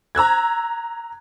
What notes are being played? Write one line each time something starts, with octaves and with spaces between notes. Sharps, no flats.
A#5 E6 F#6 G#6